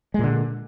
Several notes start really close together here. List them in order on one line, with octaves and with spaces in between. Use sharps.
G#3 A#2 D3